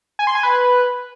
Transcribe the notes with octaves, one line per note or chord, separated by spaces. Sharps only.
G#5
C6
G#5
B4